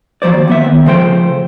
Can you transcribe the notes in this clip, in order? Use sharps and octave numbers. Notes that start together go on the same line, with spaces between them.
F3 F#3 C5 D5
D#2
D#2 B3 E5
D#3
C#3 F3 A3 C5 G5